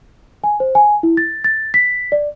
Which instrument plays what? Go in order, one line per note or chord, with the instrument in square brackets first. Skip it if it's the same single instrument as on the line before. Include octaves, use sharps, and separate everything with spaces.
[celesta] G#5
C5
G#5
E4
A6
A6
B6
D5